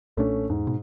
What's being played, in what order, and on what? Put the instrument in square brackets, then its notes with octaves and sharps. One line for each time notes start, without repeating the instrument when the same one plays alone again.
[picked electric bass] B1 A#2 D4 [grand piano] A3 C#4
[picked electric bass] E2 [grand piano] G#2
[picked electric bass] B2